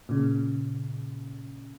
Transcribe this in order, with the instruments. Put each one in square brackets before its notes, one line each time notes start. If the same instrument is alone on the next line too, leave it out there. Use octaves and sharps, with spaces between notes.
[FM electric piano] A#2 C#3